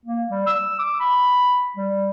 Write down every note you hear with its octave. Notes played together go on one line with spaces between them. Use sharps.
A#3
G3
E6
D6
B5
G3